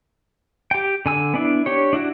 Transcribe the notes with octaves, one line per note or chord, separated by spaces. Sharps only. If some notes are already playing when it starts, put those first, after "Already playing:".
G4 G5
D3 G#5 E6
B3 D4 E4
D4 G4 C#5
D4 E4 F#4